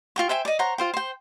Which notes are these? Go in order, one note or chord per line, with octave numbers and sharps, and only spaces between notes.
F4 G5 C#6
C5 E5 G5 G#5
D5 D#5
C5 C#5 F#5 A#5
F4 C5 G5
C5 G5